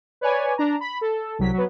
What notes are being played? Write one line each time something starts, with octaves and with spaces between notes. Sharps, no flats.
B4 C#5 D5 G#5
D4 A#5
B5
A4
C2 F#3 B6
F#3 B3